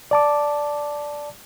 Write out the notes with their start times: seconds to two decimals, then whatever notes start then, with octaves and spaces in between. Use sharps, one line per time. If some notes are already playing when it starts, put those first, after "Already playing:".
0.11 D5 A5 D6